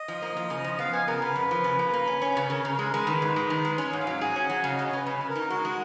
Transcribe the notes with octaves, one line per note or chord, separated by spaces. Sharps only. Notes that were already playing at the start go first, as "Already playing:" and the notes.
Already playing: D#5
F3
A#3
F3
C#3
F3
B3 F5
B3 G#5
C#3 A#4
C#3 B4
F2
F3
C#3
A#3
A#3
C#4
C#4
C#3
C#3 A#4
C#3
A#4
G#3
G#3 B4
D#3
G#2
G#3
D#3
G#3
C#4
G#2
F5
F#3
G#4 F#5
C#4
F#5
F#3
C#3 F5
C#3 D#5
C#5
C#3 B4
C#3 B4
C#3
A#4
D#4
G#3 F#4
G#3